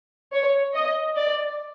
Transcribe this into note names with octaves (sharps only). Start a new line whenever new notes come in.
C#5
D#5
D5